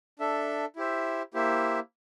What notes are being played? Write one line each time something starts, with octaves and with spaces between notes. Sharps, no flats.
D4 A4 E5
E4 G4 C5 E5
A#3 E4 G4 C5 E5